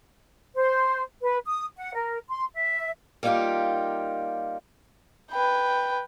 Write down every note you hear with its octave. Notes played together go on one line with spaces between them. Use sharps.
C5
B4
D#6
F#5
A#4
C6
E5
G3 A#3 B3 D#4 F4 G4
B4 G5